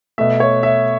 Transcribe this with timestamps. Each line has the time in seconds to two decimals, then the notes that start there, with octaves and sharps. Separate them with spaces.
0.18 B2 A3 E5
0.40 C#5
0.63 E5